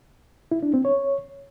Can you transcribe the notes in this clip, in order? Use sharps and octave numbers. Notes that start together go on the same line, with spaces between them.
E4
D4
C4
C#5